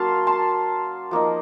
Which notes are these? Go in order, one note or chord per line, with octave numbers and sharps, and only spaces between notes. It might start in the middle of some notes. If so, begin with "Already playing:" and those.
Already playing: F#3 A#3 C#4 F5 A5 C6
A5 C6
F3 A#3 D#4